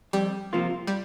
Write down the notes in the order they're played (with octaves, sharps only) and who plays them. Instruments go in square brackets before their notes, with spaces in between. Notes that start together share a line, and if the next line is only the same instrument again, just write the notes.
[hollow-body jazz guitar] F2 [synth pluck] G3
[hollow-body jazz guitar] C3 F3 A#3 F4
[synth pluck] G3